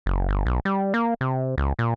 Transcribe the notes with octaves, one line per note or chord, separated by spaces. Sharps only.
F#1
G1
B1
G3
A#3
C3
C#2
A#2